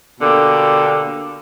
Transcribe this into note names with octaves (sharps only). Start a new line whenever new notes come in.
B2 D3 A#3 G4